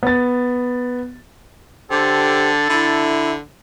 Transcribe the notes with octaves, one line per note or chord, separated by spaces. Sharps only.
B3 A6
D3 G4 A4 C5
D3 E4